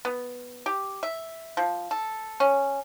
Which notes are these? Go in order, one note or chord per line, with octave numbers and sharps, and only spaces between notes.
B3
G4
E5
F3
A4
C#4